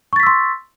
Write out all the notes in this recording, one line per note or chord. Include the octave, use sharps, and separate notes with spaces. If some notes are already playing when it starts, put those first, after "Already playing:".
C6 C#6 E6 A6 B6